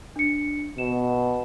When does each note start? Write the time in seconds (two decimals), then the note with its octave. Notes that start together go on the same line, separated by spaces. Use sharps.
0.16 D4 C#7
0.78 B2 E7